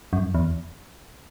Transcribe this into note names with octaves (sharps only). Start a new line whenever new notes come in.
F#2
E2